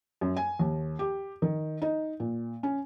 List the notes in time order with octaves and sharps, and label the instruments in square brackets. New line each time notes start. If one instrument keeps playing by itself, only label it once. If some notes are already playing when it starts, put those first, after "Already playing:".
[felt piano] F#2
G#5
D#2
G4
D#3
D#4
A#2
C#4